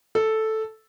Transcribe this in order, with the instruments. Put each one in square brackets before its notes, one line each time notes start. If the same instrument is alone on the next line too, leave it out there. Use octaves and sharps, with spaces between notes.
[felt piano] A4